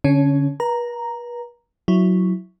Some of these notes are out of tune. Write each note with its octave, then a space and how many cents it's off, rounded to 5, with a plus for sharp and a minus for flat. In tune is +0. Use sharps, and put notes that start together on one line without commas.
D3 -25 C#4 +0 C#5 +20
B4 -40 A#5 +0
F#3 +0 E4 +0